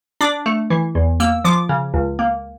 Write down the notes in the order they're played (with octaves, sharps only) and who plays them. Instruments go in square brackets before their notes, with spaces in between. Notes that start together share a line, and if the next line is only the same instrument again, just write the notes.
[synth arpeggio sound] D4 D6
A3
E3
E2
A#3 E6
F3 D6
C#3
C#2
A#3